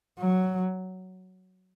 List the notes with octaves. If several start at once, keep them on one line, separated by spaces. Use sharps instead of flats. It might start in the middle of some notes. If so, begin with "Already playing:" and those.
F#3